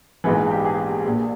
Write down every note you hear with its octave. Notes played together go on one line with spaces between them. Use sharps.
A#1 G#2 E3 B3
G4
G#4
A#1 A#2